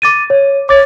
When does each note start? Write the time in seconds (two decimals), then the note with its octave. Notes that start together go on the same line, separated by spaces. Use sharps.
0.02 D6 A6 D#7
0.30 C#5
0.69 C#5 D6 A6